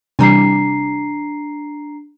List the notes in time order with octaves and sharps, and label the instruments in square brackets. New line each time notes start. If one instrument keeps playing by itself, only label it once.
[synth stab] C3 E3 G3 [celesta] D4 A#5 C7